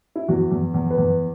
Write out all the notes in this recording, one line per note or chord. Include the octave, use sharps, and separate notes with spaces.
E4
E2 F#4
E2
E2
B4
E2